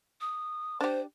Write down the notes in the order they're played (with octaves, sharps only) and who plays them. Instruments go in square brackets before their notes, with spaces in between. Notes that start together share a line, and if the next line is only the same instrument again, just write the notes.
[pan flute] D#6
[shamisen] D4 G4 [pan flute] C5